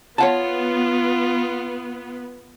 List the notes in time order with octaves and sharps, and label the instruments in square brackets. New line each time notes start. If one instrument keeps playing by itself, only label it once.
[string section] B3 [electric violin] F4 [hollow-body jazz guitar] C#5 F#5 A5